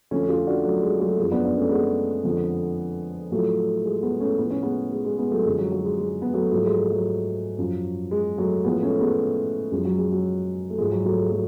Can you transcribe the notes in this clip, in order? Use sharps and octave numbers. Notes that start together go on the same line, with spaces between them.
F2 D3 F3 A3 C#4
C#4 F4
D4 F#4
F#3 A3
G#3
F#3 A3
F#2 F3 G#3
B3 D4
B3 D4
A3 C#4
G#3 B3
F2 D3 F3
A2 F3 F#3 A3
G#3
G#3 B3
A3 C#4
A2 F3 B3
C#4
G#3 B3
G#3
G#3
G#3 B3
F#3 A3
F#2 D3 F3 G#3
F#3
F#3
G#3
G#3
B3
F#3 A3
G#2 F3 F#3 A3
G#3
G#3
F#3
F#2 F3
G#3
F#3 A3
A2 F3 G#3 B3
A3 C#4
G#3 B3
F#2 F3 G#3
F#3
G#3
F#3
A3
G#2 F3 G#3
F#3
F#3 A3
G#3
F#3 A3